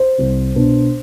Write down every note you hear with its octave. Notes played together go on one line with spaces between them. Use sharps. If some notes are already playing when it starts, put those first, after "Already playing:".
Already playing: C5
C2
B2 B3 D4